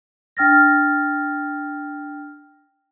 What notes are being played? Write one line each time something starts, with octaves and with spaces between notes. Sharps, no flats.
D4 G5 F6 A6 A#6